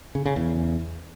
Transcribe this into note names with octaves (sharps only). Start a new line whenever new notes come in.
C#3
C#3
E2